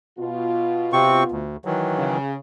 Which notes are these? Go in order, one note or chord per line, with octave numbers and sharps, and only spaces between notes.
B2 F4
C3 C4 C#6
D2
D#3 E3 F#3
C#3